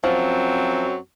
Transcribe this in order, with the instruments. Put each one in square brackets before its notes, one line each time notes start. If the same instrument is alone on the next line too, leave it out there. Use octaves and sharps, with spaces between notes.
[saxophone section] F#2 F#3 C4 [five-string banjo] F3